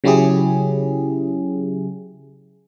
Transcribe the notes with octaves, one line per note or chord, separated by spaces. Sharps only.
C#3 F#3 C#4 E4 G4 G#4